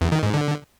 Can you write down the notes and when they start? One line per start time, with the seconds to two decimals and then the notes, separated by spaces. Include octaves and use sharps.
0.01 E2
0.12 D#3
0.23 G#2
0.34 D3